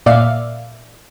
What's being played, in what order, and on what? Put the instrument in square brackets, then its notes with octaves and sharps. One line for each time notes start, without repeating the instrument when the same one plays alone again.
[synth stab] A#2 D5 E5 F5